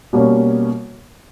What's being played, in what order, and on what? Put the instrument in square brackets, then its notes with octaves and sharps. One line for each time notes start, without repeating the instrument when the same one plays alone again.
[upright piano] B2 G3 A#3 C#4